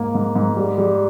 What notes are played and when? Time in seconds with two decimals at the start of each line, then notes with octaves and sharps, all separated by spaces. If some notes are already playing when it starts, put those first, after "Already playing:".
Already playing: G#2 A#3
0.14 G#2
0.35 G#2
0.57 G3
0.78 G3